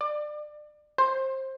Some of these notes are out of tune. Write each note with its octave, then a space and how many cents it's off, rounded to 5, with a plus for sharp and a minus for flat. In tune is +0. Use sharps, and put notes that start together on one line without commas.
D5 +30
C5 +20